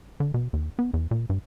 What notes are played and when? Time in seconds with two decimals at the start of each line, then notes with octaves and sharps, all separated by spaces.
0.20 D3
0.34 B2
0.53 D#2
0.79 B3
0.93 E2
1.11 A#2
1.30 G2